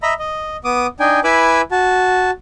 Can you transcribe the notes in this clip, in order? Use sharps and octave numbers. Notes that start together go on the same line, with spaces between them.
D#5 E5 A#5 B5
D#5
B3 D6 D#6
D4 D#4 G5 G#5
E4 B4 G#5 B5 D6 E6
F#4 A5